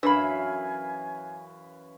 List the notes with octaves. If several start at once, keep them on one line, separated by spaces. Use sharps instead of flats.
F#2 E3 D4 B4 F5 G#5 B5 E6